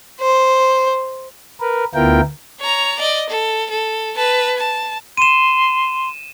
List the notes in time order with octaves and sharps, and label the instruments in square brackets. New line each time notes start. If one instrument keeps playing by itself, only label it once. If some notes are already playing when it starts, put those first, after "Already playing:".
[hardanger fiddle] C5
[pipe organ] A#4 B4
D2 B3 E4 F4 A#4 G5
[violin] C#5 A#5
D5 D#5
A4
A4
B4 A5
A5
[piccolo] C6 [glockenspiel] D#7 E7